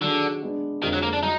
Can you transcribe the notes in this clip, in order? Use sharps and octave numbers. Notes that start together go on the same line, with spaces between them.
D3 D#3 F#3 D4 G#4
G#3 B3 D4
F2 D3 D#3 F3 G#3
F#3
A#3
D4
F#3 D#4